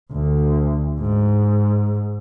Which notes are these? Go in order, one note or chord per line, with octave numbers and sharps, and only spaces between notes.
D2
G#2